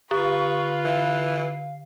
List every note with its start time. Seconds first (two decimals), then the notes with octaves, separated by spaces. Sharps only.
0.11 D3 F4 B4 C#6
0.85 E3 F5